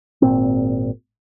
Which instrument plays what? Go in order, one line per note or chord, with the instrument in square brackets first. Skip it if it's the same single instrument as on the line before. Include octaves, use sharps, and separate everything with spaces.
[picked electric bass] G#1 A#2 C4